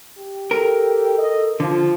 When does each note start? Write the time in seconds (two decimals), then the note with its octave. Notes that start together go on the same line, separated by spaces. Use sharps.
0.18 G4
0.51 A4 A#4
1.18 D#5
1.60 D3 F3 F4